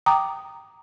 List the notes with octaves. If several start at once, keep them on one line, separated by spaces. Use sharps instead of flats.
G5 A#5 D6 D#6